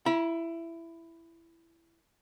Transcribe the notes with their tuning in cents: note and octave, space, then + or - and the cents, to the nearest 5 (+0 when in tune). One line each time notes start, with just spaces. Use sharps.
E4 +15 B5 -40